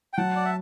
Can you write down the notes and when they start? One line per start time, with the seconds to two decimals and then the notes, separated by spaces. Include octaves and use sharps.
0.13 G5
0.17 F#3 F#5 A5
0.36 D5
0.45 E5